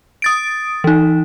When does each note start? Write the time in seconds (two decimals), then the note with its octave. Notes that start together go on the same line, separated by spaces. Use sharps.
0.22 D#6 A6 D7
0.84 E3 D#4